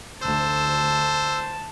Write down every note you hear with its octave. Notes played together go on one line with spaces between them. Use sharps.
D2 C5 A5 E6